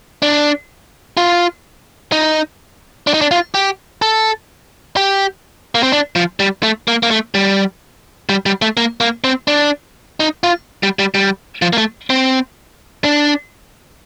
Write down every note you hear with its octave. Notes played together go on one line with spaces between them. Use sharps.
D4
F4
D#4
D4
D#4
D4
F4
G4
A4
G4
A#3
C4
D4
F3
G3
A3
A#3
A#3
A3
G3
G3
G3
A3
A#3
A#3
C4
D4
D#4
F4
G3
G3
G3
F3
A#3
A3
C4
D4